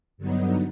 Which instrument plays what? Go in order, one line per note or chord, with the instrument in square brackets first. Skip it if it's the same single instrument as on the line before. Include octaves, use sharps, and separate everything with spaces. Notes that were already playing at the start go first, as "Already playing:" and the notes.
[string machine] G2 D3 F#3 B3 D#4